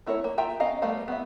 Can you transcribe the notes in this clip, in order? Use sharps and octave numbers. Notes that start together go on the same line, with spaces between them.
A3 E4 A#4 B4 C#5
A#3
F4 E5 G5 A#5
B3 C#4 D#5 F5 A#5
G3 A3 B3 A#4 F5
B3 E4 E5